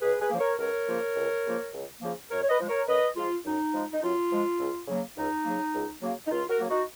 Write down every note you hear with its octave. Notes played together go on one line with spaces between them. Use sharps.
C#2 G#4 B4
G#4 B4
C#3 F3 A#3
A#4 C#5
C#2 A#4 C#5
C#3 F3 A#3
C#2
C#3 F3 A#3
C#2
C#3 F3 A#3
F#2 A#4 C#5
C#5
B4 D#5
F3 G#3
A#4 C#5
F#2 B4 D#5
F3 G#3 F4
F#2 D#4
F3 G#3
D#4
F#2 F4
F3 G#3
C#2
C#3 F#3 A#3
C#2 D#4
C#3 F#3 A#3
C#2
C#3 F#3 A#3
D#4
C#2 F4
F#4 A#4
C#3 F#3 A#3
D#4 F#4